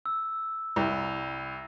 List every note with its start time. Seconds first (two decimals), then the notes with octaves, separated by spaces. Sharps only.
0.06 E6
0.76 C2